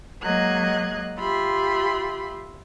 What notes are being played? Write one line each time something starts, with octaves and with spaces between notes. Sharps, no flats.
F#3 G#3 A#3 D#5 F#6 G#6
F4 G4 E5 B5 C6